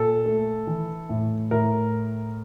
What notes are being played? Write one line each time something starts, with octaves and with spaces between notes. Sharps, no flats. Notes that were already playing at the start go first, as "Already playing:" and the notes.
Already playing: A#2 A4
A3
E3
A2
A2 A#4